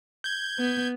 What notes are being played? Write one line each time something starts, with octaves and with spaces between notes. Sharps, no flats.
G6 G#6
B3